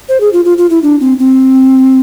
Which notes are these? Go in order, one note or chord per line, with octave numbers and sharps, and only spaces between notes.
C5
G#4
F4
F4
F4
E4
D4
C4
C4